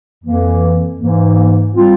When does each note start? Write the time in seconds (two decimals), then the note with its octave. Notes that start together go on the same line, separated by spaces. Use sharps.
0.24 F2 E3 A#3
0.99 G#2 E3 A#3
1.76 G3 C4 F4